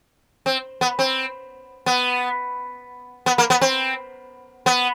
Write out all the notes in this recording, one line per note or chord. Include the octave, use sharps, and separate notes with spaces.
C4
B3
C4
B3
B3
A#3
B3
C4
B3